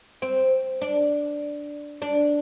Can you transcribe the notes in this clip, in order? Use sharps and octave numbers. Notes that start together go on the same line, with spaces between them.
C4
D4
D4